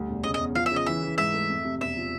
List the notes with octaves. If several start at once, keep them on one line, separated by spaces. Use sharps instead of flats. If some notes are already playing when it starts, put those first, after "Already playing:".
Already playing: D2 G3
E1
C#3 D#5
D#5
E2
F3 F5
E5
C#3
D#5
E3 E5
E3
G#2 E5
A3
F2
C3
E1 E5
F3